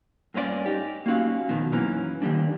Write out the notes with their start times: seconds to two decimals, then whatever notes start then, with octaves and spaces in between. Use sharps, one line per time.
0.34 G2 A#3 C#4 E4 D5
0.66 D#4 G4
1.06 A#3 C#4 F#4 F5
1.48 F2 B2 D#3
1.72 F#2 E3 A#3 C#4 A#5
2.22 D#3 F#3 G3 A#3 D4